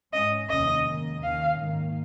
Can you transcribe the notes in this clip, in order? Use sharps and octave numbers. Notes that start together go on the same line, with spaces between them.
G#2 G#3 C#4 D#5
F1 D#2 D#3 A#3 C#4 D#5
G#2 D#3 A#3
D#2 D#3 C#4 F5
G#2 D#3 A#3